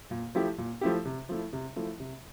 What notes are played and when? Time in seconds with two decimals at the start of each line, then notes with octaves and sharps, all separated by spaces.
0.11 A#2
0.35 F3 A3 E4 G4
0.58 A#2
0.81 F3 A3 E4 G4
1.05 C3
1.29 F3 A3 E4
1.53 C3
1.76 F3 A3 E4
2.00 C3